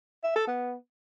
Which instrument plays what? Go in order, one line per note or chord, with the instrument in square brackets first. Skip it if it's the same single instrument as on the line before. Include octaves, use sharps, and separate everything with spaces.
[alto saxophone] E5
A4
B3